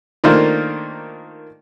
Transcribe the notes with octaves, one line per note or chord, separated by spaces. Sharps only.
D#3 A3 A#3 D4 F4 C5